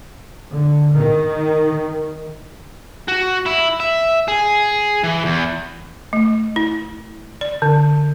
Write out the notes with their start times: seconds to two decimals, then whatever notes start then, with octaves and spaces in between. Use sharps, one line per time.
0.50 D3
0.96 D#3
3.08 F#4
3.46 E4
3.80 E5
4.28 G#4
5.04 E3
5.25 E2
6.13 A3
6.56 E4
7.41 D5
7.62 D3